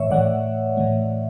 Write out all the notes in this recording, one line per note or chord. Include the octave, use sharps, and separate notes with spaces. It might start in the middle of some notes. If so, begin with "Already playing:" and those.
Already playing: A2 E3 A3 C#5 E5
A2 E3 A3 D5 F#5
A2 E3 A3